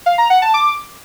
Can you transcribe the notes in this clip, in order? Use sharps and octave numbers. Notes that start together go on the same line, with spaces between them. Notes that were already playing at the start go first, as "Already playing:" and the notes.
F5
A#5
F#5
A5
D6